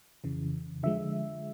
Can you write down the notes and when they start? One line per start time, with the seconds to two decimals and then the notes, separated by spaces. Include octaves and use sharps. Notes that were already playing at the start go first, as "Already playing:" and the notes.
0.24 F2 C#3 E3
0.83 D3 F3 G#3 E5